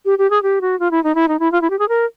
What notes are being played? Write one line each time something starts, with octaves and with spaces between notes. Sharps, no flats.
G4
G4
G#4
G4
F#4
F4
E4
D#4
E4
D#4
E4
F4
E4
G4
G#4
A#4